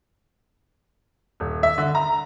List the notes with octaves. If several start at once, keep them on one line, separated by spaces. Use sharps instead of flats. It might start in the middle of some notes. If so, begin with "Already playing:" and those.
D#1
E5
D3
A#5